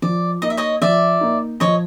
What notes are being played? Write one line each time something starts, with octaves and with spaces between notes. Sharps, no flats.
F3 D5
A#3 D#4 D#5
E5
C#5 D#5
F3 D5 E5
A#3 D#4
F3 C#5 D#5